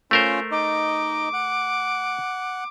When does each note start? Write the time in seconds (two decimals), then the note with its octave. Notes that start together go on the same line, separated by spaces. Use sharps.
0.11 A3 C#4 F4 A#4 C5
0.51 D#4 D#5 D6
1.33 F#5